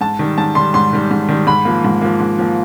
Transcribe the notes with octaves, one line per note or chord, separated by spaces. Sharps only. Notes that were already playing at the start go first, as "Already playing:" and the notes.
G#2 A5
D#3 G3
G#2 A5
D#3 G3 C6
G#2 C6
D#3 G3
G#2
D#3 G3
G#2 B5
F3 A#3
G#2
F3 A#3
G#2
F3 A#3